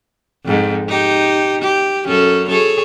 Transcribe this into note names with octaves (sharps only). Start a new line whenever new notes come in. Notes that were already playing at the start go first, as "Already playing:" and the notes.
F2 G#2
D#4 G4
G4
F#2 C#4 A4
G#4 A4 C#5